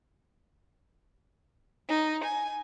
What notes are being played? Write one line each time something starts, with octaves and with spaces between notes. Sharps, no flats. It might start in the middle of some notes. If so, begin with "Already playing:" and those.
D#4
G#5